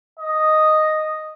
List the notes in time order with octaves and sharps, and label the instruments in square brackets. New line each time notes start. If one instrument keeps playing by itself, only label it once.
[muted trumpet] D#5